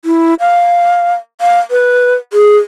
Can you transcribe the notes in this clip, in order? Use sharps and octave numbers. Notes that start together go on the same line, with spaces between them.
E4
F5
F5
B4
G#4